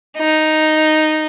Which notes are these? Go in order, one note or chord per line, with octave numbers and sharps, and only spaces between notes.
D#4